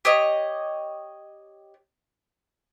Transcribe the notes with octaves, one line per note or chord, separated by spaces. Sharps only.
G4 C#5 D#5